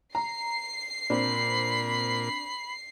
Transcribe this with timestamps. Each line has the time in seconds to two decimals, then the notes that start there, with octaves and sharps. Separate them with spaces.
0.15 A#5 C7
1.10 A#2 C4 D4 B5